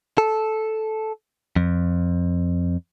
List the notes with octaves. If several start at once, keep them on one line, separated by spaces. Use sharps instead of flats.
A4
F2